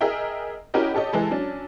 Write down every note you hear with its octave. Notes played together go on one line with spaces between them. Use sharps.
G#4 A#4 D#5 E5 G5
C#4 E4 F#4 G4 A#4 D#5
G4 A4 C#5 D#5
E3 G#3 A4
F#3 C#4 D4